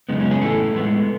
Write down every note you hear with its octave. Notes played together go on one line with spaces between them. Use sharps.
F#2 C#3 G#3 B3 D#4
C#4
G#4
A2 E3 A3 A4
A2 G#3 B3